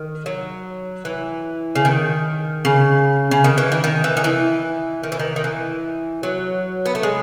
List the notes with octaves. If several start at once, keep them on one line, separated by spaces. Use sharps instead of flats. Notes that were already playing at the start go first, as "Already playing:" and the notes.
Already playing: D#3
F#3
E3
C#3
D#3
C#3
C#3
D#3
E3
D#3
D#3
E3
D#3
E3
D#3
E3
D#3
D#3
E3
F#3
B3
A3
G#3